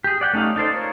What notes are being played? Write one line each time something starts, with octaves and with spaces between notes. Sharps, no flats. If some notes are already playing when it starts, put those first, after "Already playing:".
G4 G#4
D5 F#5 G5
A3 C#4 D#4 G4 F5
D#4 A4 C5 D5
F4 A#4 C#5